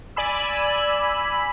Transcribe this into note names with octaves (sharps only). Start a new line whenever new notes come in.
D5 G#5 B5 E6